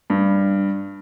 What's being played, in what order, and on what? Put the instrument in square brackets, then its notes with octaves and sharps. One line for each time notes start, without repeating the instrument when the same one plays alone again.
[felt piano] G2